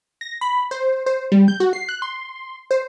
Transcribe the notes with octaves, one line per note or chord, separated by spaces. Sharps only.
A#6
B5
C5
C5
G3
G6
F#4
C7
F#6
C6
C5